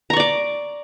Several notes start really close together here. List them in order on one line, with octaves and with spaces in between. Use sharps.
A#5 C#6 D5 D6